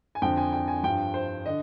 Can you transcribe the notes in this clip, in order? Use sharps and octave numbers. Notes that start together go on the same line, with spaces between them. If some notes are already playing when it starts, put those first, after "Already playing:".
G#5
F2 D3 F3 G5
G#5
G5
G#5
G2 F3 G5
C5
D3 D#5